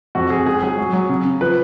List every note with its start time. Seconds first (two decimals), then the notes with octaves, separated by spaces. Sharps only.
0.15 F2 F#4
0.30 F2 G#4
0.46 C#2 G#4
0.63 F#3 G#4
0.78 F#3
0.93 F#3
1.09 C#3
1.25 C#3
1.41 F3 B4